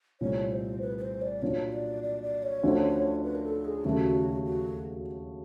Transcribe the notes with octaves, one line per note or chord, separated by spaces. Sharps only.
C2 A#2 F3 A3 C#5
C5
B4
B4
C5
D5
A#2 F#3 A#3 D4 F4 C#5
D5
D5
D5
C#5
D2 D3 F3 A3 C#4
B4
A#4
A4
G#4
D#2 C#3 F#3 A3 F#4
F#4